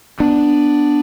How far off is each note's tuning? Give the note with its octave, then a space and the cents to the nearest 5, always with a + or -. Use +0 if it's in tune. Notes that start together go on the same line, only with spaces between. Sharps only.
B3 +0 D4 +0